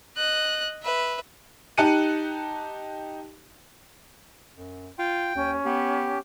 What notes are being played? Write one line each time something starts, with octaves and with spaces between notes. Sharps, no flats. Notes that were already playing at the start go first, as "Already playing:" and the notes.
D#5 F#6
B4 E5
D#4 G4 A5 F#6 C#7 D#7
F#2
F4 G5
D#2 C#4
B3 G4